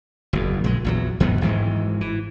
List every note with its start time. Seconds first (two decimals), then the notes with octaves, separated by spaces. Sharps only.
0.33 F#1 E2
0.64 A#1 G#3
0.85 A#1 E2 F#3
1.20 E2 G#2 F#3 B3
1.41 G#1 G#2 E3 G#3
2.01 E3